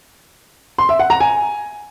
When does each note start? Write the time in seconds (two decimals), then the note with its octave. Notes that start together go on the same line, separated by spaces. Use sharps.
0.78 C6
0.89 E5
0.99 F#5
1.10 A#5
1.20 G#5